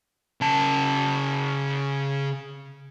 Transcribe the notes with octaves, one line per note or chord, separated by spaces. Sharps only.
C#3 A5